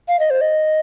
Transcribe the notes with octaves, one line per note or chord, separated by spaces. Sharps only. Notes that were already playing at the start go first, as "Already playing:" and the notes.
F5
D#5
C5
D#5